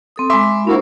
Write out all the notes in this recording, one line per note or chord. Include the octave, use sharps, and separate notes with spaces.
C4 A4 D#6
G#3 E5 B5 C6 D6
A#3 D4 E4 F#4 C5